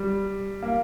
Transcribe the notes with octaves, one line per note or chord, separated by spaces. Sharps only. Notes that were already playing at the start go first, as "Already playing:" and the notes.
Already playing: G3
A#3